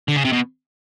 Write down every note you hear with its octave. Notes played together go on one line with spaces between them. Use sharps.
D3
C#3
C3
B2